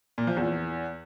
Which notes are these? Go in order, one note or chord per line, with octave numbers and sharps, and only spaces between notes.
A#2
F3
E2